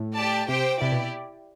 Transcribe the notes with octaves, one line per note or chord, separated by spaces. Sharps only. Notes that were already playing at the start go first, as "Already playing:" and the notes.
Already playing: A2
G4 D5 A5
C3 G4 C5 G5
C3 E4 G4 D5
B2